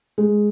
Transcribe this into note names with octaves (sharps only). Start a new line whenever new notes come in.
G#3